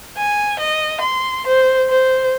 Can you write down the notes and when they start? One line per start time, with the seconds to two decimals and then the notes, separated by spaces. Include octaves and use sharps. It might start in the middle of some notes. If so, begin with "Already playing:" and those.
0.17 G#5
0.59 D#5
1.00 C6
1.46 C5
1.89 C5